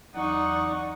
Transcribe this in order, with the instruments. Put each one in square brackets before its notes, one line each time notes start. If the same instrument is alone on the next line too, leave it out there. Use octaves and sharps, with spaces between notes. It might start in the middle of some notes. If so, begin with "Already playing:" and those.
[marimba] E2 E3 F#3 [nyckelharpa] D#4 [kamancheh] D5 C#6 [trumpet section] F#5